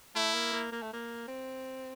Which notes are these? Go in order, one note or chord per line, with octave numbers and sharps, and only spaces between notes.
A3 E4
A#3
A#3
A#3
A3
A#3
C4